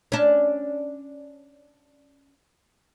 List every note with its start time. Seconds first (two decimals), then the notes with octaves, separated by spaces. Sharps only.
0.12 C#4 D4